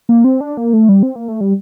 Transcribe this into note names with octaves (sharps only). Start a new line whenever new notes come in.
A#3
C4
D4
A#3
A3
G3
C4
A#3
A3
G3